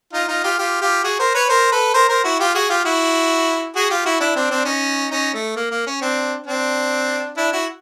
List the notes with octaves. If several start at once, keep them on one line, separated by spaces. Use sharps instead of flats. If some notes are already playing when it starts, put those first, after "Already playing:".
D#4 F4
D#4 F4
F4 G4
F4 G4
F4 G4
F#4 G#4
A#4 C5
B4 C#5
A#4 C5
A4 B4
A#4 C5
A#4 C5
E4 F#4
F4 G4
F#4 G#4
F4 G4
E4 F#4
F#4 G#4
F4 G4
E4 F#4
D4 E4
C4 D4
C4 D4
C#4 D#4
C#4 D#4
A3
A#3
A#3
C#4
C4 D4
C4 D4
D4 E4
E4 F#4